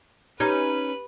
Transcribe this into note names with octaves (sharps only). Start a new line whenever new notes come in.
C#4 D#4 G4 B4 G6 G#6